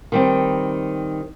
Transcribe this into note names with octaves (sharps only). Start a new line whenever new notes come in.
D#3 G3 C4